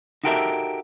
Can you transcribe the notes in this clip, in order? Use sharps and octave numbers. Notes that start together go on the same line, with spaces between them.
D#4 F#4 G4 A4 A#4 E5